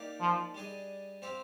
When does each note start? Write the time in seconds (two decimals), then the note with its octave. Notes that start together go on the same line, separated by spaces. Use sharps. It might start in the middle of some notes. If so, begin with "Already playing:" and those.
Already playing: A#3 D#4 G4 D5 F5
0.20 F3
0.54 G3 D4 G#4 D#5
1.22 C4 G4 C5 F5